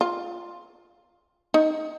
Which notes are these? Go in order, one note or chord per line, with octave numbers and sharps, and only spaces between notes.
F4
D#4